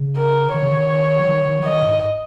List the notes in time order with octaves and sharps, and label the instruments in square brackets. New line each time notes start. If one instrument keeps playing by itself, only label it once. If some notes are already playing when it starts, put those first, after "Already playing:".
Already playing: [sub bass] C#3
[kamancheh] A#4
[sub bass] D#3 [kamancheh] C#5
[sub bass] C#3
D#3
F#3
D#3
D#3
F#3
[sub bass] D#3 [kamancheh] D#5
[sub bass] G#2